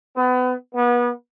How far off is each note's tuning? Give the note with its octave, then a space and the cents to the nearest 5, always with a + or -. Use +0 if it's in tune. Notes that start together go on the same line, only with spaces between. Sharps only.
B3 +30
B3 -30